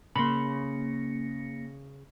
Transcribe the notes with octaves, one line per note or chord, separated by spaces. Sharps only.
C#3 A#3 B5 C6 A#6 C#7